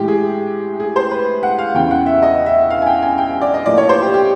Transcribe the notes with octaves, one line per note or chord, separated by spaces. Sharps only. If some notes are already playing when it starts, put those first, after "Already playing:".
Already playing: A2 E3 G#3 G4
G#4
G#4
C5
B4
F#5
F5
E2 C#3 E3 G5
F#5
E5
D#5
E5
E5
F5
G#5
G5
G#5
G5
D5
D#5
A2 F3 A#3 D5
C#5
C5
G4
G4